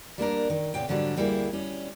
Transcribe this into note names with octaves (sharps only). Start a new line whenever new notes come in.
G3 A#3 D4 A#4
D#3
A#2 C#3 B3 G5
G#2 D3 F#3 G3 D4
D2 G3 A#3 E4 G#4
G3 C#4